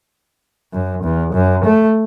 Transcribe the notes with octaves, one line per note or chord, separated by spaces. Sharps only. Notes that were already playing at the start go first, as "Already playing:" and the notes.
F#2
E2
F#2
A3